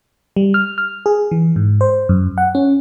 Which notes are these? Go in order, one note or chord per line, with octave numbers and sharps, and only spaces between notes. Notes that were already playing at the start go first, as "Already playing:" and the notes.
G3
F6
F6
G#4
E3
G#2
C5
F#2
F#5
C#4